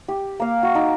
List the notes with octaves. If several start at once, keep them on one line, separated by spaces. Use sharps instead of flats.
G4
A#3 F5
F#4
D#4 D6